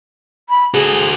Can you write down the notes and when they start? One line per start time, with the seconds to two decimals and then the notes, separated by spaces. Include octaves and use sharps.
0.49 B5
0.74 F#4 G#4 A4